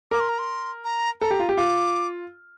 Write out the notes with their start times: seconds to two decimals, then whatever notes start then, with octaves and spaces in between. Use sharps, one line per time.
0.11 A#4 D6
0.20 C6
0.29 A#5
0.39 C6
0.84 A#5
1.21 A4 A#5
1.31 G4
1.39 F4
1.49 G4
1.57 F4 D6